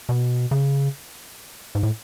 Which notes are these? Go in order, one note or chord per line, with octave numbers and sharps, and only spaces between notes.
B2
C#3
G#2
A2